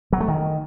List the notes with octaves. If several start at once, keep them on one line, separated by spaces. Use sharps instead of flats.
F#3
A3
D#3